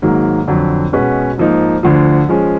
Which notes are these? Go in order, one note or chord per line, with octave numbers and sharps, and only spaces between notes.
G#2 D#3 F#3 A#3
F2 D3 F#3
B2 G#3 C#4 F#4 B4
G#2 F3 A#3 D#4
D2 D3 F3
F3 G#3 C#4